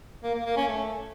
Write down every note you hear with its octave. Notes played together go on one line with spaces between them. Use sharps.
A#3
A#3
A#3
C#4
A3